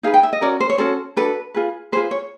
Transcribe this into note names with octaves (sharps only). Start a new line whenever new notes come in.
D#4 G#4 B4 F5
G5
E5
D#5
C#4 F#4 A#4 D5
C5
C#5
C#4 F#4 A4 C5
D4 F#4 A4 B4
F4 G#4 B4
F4 G#4 B4 C5
C#5